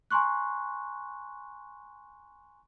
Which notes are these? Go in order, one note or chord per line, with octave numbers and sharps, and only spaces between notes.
G#5 A#5 C6 C#6 F#6